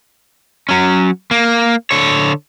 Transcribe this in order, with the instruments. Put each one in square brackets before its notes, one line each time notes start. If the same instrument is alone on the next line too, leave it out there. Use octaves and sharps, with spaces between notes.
[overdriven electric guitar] F#3 C#4
A#3
D3 C#5